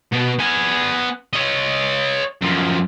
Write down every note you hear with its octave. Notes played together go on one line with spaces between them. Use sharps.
B2 B3
B3 G#5
C#5 D#5
F#2 F3